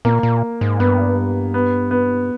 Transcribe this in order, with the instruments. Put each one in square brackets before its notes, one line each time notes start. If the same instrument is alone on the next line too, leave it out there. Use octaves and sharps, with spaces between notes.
[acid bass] A#2 [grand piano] A#3
[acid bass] A#2
G#2
[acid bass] G2 [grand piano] B3
[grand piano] B3
B3